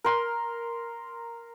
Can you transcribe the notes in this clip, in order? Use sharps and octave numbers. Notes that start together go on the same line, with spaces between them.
A#4 C6